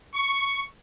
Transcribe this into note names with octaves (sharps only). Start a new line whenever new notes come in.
C#6